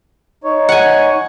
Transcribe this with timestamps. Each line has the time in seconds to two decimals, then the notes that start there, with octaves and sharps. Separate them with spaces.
0.44 D#4 C#5
0.69 F#5 G#5